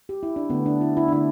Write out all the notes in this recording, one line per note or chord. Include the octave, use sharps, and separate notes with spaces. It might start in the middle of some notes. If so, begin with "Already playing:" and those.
G4
E4
D4
D3 A3 B3
D4
E4
E4
D4
D3 A3 E4